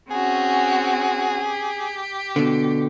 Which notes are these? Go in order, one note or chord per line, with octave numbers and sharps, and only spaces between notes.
C4 C#4 F#4 G#4
G4
B2 D3